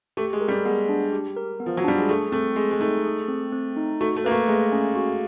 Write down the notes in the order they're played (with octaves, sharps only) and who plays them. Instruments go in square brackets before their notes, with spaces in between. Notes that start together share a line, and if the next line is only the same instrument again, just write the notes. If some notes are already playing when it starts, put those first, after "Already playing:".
[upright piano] A3 [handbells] G4
[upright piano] G#3
[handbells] A#4
[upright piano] G3
[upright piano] G#3 [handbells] B3
[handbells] D4
G4
A#4
B3
[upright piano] F3
F#3
[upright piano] G3 [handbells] D4
[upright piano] G#3
[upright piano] A3 [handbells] G#4
[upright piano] A3 [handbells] C4
[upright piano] G#3 [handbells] C4
[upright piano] G#3
[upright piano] A3 [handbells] D#4
[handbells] G#4
C4
C4
D#4
[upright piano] A3 [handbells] F#4
[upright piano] A3
[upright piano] A#3 [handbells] B4
[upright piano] A3
[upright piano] G#3 [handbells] A3
[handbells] C#4
F#4